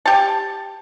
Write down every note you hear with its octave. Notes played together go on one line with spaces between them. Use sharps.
G4 A5